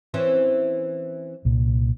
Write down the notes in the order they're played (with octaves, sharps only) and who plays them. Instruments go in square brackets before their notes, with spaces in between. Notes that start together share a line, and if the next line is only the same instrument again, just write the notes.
[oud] E3 C4 C#4
[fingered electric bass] C2 A#2